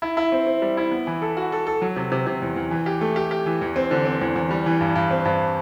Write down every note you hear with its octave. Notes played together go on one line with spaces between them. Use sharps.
E4
E4
C4
C4
G3
E4
B3
E3
A4
F#4
A4
A4
F#3
C3
C3
C3
E2
E2
E3
G4
A3
G4
G4
E3
E2
C4
D3
C4
E2
E2
G3
E3
G2
G2
C4
G2